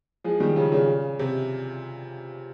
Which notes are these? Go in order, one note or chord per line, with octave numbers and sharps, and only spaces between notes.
F3 G#3
D#3 G3
C#3 F3
A#2 C#3
C3